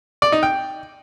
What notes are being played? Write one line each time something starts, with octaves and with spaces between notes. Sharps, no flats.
D5
D#4
G5